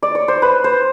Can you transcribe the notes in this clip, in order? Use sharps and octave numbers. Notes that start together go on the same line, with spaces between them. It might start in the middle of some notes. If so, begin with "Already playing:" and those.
D5
C#5
C5
B4
C5